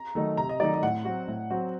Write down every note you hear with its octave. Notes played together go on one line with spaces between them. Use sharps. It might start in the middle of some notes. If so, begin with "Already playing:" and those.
Already playing: A#5
D#3 F#3 A3 D#4
C3 A#5
D#5
D#3 F#3 A3 D#4 D5
D#5
A2 F#5
F#3 C4 F#4
A2
F#3 C4 F#4